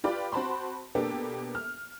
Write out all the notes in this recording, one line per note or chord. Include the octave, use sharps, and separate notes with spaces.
F4 G4 B4 D5 B5
C4 F#4 C5 A5 B5 C6
B2 A#3 B3 D4 G4 A4
F6